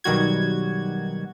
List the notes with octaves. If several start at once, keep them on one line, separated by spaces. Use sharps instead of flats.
B1 D#3 G3 F#4 G#6